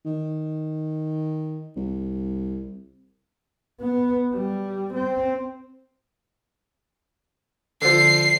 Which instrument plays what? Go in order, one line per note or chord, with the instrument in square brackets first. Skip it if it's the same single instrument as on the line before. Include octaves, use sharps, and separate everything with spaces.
[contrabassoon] D#3
C2
[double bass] B3
G3
C4
[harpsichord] D3 F3 [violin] C7